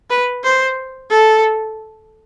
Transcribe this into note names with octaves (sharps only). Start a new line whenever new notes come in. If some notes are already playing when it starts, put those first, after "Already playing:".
B4
C5
A4